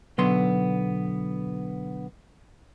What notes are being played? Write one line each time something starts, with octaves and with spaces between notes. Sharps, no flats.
B1 D3 F#3 B3 C6